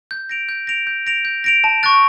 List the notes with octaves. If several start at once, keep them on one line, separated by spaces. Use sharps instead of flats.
G6
A#6 D7 F7
G6
A#6 D7 F7
G6
A#6 D7 F7
G6
A#6 D7 F7
A5
C#6 F#6 A6